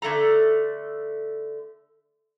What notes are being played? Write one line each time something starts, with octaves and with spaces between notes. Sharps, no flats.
D3 A3 A4 A#5